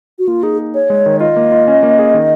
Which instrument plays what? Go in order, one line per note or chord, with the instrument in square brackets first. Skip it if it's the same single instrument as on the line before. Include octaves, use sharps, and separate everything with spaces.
[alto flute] F#4
[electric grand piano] A#3 [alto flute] F4
[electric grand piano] D#4 [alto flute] G#4
[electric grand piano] G#4
[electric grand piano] G#4 [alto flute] C#5
[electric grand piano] G#3
D#3
[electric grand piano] F4 [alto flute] D#5
[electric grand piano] A#3
F4
C#4
A#3
G#4
D#3